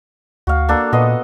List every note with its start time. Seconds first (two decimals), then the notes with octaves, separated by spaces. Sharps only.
0.47 D2 F#4 F5
0.69 A#3 D4 A4
0.92 A#2 B3 D#5 C6